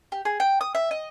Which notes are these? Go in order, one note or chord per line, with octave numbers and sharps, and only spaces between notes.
G4
G#4
G5
D#6
E5
D#5